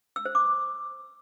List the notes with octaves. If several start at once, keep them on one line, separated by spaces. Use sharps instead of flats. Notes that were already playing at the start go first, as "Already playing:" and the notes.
E6
C5
D6